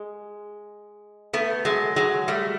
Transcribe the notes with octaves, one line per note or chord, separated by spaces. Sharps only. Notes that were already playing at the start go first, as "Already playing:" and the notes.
Already playing: G#3
A3 B3
F#3 G#3
F#3 G#3
G3 A3